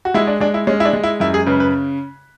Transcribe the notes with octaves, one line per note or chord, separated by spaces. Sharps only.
F#4
G#3 E4
D4
G#3 D4
E4
G#3 C#4
E4
D4
G#3
E4
F#2 E4
G#4
C#3 B4
B4